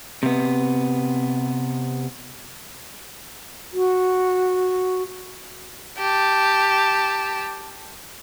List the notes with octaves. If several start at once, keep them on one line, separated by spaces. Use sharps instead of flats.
C3 B3
F#4
G4 A5